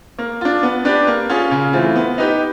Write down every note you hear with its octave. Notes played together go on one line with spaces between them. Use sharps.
A#3
D4 F4
B3
D4 G4 B4 D5
A#3
C#4 F4 G#4
C#3
E3 A3 C4 F4
B3
D#4 G4 B4